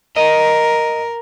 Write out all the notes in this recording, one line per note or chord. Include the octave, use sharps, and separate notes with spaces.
A#4 D#5